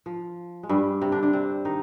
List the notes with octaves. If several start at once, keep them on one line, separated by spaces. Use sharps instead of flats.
F3
G#3
G2 G3
C3 C4
D3 D4
D3 D4
C3 C4
D#3 D#4